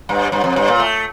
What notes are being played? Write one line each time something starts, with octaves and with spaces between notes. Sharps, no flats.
G2
G2
F2
G2
A#2
A3